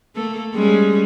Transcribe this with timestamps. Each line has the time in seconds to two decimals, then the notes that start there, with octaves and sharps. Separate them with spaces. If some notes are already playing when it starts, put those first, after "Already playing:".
0.15 A3 A#3 A4
0.55 G3 G#3 C#4